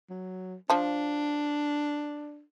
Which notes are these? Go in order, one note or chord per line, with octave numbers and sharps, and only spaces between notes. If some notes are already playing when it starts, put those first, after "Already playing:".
F#3
F3 D4 A5